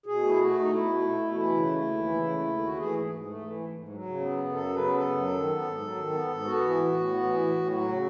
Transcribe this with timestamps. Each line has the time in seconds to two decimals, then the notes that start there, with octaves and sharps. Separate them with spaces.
0.06 B2 G#4
0.23 A3
0.28 E4
0.38 A3 F#4
0.54 B2
0.60 D#4
0.70 B2 E4
0.86 A3
1.02 A3
1.18 B2
1.34 E3 E4
1.50 C#3
1.66 A3
1.81 D#2
1.97 E3
2.13 C#3
2.30 A3
2.45 D#2
2.61 A3 F#4
2.77 E3 G#4
2.93 G#2
3.10 G#2
3.26 A3
3.41 E3
3.57 G#2
3.73 G#2
3.89 F#3
4.06 C#3
4.20 B3
4.38 F#2
4.53 F#3 A4
4.69 C#3 B4
4.84 B3
4.95 A4
5.01 F#2
5.17 F#3
5.32 D#3
5.48 B3
5.65 G#2
5.80 F#3
5.96 D#3
6.13 B3
6.28 G#2
6.44 B3 F#4
6.61 E3
6.76 A2
6.93 A2
7.09 B3
7.23 E3
7.39 A2
7.55 A2
7.72 F#3 F#4
7.88 C#3